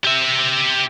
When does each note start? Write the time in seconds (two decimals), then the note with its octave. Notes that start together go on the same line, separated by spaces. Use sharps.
0.04 G4 E5